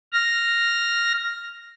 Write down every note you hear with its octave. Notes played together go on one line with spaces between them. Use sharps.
F6 A#6